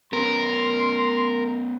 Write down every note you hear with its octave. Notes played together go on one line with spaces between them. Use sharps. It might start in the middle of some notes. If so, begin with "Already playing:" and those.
B3 C#4 A#4 B4 C6